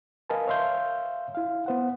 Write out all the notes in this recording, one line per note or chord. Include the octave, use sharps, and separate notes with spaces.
A#4 B4 D#5 F5 G#5 A5
C#5 E5 F5 C6 G6
E4 F5
B3 C5 F#5